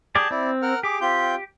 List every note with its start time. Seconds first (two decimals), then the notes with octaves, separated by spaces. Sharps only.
0.15 G4 G#4 D5 A5
0.31 C4 E4 D5
0.62 A#4 F#5 F6
0.83 G4 G#4 D6
1.01 C4 F4 G6